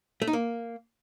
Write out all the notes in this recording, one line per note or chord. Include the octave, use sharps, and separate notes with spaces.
A3
D#4
A#3